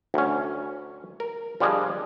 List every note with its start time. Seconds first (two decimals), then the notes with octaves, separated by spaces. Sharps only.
0.14 D2 C#4
1.20 A#4
1.60 F3 G3 D4 G#4 D#5